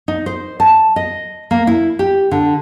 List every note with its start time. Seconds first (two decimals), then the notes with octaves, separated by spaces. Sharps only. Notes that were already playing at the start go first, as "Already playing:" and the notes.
0.08 D#4
0.26 C5
0.60 A5
0.96 D#5
1.51 A#3
1.67 E4
1.99 G4
2.31 D3